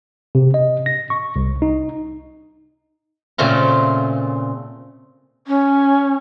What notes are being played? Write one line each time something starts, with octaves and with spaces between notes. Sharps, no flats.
C3
D#5
A#6
C#6
C2
D#4
A#2 C#3 A3 C4 F4
C#4